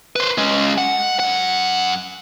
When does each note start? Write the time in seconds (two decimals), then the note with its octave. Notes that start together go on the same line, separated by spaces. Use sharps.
0.16 B4 C5
0.38 G#3 C#4
0.78 F#5
1.20 F#2 F#5